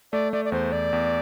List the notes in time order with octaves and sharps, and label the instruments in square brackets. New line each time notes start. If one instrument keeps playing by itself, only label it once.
[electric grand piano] A3 [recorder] D5
[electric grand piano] A3 [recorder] D5
[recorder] D5
[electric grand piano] E2 [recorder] C5
[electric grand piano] E2 [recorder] D5
[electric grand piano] E2